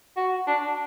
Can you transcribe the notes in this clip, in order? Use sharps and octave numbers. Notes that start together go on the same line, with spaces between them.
F#4
D4